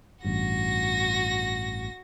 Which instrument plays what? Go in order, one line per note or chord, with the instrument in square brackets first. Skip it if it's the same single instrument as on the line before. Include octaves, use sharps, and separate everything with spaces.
[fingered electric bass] A1 G2 [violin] F#4 A#6